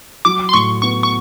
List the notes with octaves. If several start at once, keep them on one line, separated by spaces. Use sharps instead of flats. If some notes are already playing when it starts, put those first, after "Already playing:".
F#3 D6
C6
A2 C#6
B3 C#6
C#6